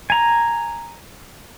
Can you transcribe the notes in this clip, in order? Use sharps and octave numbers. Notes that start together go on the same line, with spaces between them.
G#5 A#5